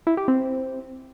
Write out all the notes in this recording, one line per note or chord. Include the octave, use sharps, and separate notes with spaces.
E4
G4
C4